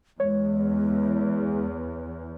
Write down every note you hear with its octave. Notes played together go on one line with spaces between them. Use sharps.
E2 G#3 C#5